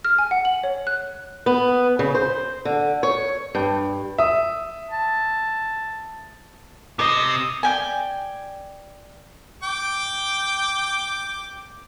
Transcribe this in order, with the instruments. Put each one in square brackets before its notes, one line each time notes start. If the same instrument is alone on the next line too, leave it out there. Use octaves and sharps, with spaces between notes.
[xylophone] F6
G#5
F#5
F#7
C#5
F#6
[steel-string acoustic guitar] B3
C#3
C5
D3
C#5
G2
[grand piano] E5 D#6
[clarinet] A5
[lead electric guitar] C3 [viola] D#5
[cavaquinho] D5 G5 G#5
[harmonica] G5 D6